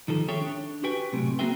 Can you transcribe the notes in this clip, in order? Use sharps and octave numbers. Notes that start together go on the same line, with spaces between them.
D#3 F3 A4
G#4 A4 C#5 E5 G5
D4
F#4 G4 B4 G5 G#5
B1 A2 C3
A#3 C4 F#4 G#4 E5 G5